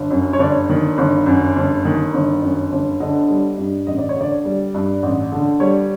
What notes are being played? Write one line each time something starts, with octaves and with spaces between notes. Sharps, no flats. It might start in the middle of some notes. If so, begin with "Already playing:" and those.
Already playing: G1
F#2
C#5
G1 D5
D#3
G1
F#2
G1
D#3
G1
F#2
G1
D3 D#5
G3
G2
A1 D#5
D5
C#5
D3 D5
G3
G2
A1
D3
G3 C#5